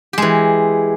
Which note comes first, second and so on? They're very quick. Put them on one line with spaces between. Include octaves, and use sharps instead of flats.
G4 G#3 E3